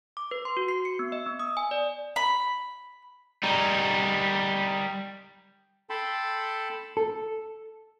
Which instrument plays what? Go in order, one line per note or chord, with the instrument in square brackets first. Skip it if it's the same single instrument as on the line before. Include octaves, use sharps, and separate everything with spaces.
[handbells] D6
B4
C6
F#4
C7
C#7
B3
D#5
B3
D#6
G#5
D5
[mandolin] B5
[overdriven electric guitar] G3 D#4
[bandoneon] A4 G5 A5 B5 C6
[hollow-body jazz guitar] A4